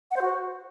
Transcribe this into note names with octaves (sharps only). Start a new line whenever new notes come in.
F#5
C5
F#4